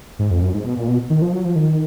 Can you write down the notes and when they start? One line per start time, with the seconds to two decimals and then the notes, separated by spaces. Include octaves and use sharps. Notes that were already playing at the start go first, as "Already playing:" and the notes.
0.19 G#2
0.31 F2
0.42 F#2
0.54 G#2
0.65 B2
0.77 A#2
0.88 B2
1.10 D#3
1.22 F3
1.32 F#3
1.45 F3
1.56 D#3